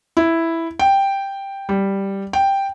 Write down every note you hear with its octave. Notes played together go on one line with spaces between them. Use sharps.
E4
G5
G3
G5